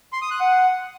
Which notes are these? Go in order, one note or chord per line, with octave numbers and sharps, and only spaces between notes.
C6
D#6
F#6
F#5